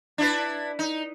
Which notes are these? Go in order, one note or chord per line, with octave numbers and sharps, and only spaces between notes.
D4 E4 B4
D#4